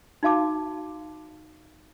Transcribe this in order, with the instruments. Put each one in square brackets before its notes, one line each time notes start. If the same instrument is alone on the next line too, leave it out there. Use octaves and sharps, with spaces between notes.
[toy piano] D#4 F#4 F5 A5 D6